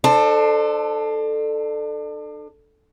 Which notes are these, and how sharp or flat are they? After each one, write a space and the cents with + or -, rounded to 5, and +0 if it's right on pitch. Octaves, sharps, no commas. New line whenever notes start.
D4 +35 A4 +0 C5 +0